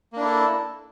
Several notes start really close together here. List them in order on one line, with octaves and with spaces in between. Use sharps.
A#3 D4 E4 A4